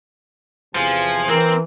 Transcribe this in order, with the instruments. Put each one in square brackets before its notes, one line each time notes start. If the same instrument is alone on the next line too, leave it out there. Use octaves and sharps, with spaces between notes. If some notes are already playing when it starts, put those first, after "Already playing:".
[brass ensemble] E2 C3 G#5 [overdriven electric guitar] F3
[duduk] E3 [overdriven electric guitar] C4 [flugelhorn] A#4